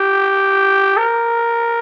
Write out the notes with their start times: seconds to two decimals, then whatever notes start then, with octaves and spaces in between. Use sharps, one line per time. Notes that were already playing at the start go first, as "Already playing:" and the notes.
Already playing: G4
0.97 A#4